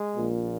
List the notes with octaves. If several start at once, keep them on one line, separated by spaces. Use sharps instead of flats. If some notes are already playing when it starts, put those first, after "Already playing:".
Already playing: G#3
A#1 A#2